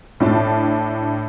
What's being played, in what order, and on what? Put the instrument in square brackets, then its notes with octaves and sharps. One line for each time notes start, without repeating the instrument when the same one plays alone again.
[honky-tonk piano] A2 D4 A5